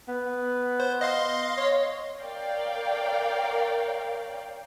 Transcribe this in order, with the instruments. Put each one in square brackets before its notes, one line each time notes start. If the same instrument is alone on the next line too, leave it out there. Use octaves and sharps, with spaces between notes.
[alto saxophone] B3
[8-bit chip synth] C5
D#5 F5 C6
[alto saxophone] C#5
[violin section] A#4 C#5 D5 F5 G5